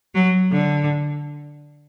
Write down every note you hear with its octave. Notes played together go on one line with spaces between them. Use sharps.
F#3
D3